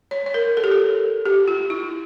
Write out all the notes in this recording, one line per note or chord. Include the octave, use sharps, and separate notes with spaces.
C#5
C#5
A#4
A4
G4
A4
G4
F4
E4